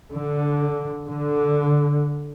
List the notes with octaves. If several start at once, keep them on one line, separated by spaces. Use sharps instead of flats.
D3
D3